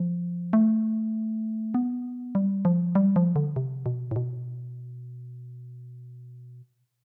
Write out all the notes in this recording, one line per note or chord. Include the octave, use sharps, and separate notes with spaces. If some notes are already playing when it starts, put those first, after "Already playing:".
Already playing: F3
A3
B3
G3
F3
G3
F3
D3
C3
B2
A2
B2